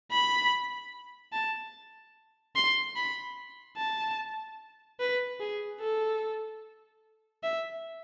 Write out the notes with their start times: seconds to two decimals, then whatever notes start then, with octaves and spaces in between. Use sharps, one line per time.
0.12 B5
1.33 A5
2.56 C6
2.96 B5
3.78 A5
5.00 B4
5.40 G#4
5.81 A4
7.43 E5